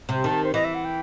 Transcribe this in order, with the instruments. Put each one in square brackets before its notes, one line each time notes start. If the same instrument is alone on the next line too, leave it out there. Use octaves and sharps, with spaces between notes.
[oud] C3
[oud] D#3 [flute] A5
[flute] C5
[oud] E3 [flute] D#5
[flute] E5
F#5
G5